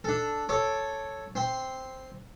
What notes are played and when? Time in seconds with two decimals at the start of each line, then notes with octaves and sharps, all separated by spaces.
0.04 D4 A4
0.49 A4 C#5 D6
1.35 C4 C6